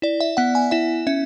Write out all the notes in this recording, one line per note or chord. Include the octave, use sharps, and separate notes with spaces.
E4 D5
E5
B3 F#5
G#5
E4 E5
C#4 E5